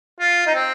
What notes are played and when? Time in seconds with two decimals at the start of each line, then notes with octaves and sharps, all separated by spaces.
0.20 F4
0.47 D#4
0.55 C4